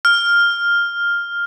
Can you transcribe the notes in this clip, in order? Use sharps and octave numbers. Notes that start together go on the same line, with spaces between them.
F6